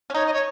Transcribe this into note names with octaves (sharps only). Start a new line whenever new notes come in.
C#4
D#4 C#5
D#5
C#5